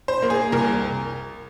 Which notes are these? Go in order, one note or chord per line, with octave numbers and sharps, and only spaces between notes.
C5
A#3
G#4
C2 A#4